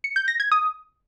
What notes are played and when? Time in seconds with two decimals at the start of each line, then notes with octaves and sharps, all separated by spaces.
0.04 C#7
0.16 G6
0.28 A#6
0.40 G#6
0.52 D#6